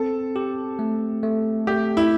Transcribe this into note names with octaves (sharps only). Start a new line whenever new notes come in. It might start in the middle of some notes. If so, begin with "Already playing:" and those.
Already playing: C4 A4
G4
A3
A3
A3 G4
E4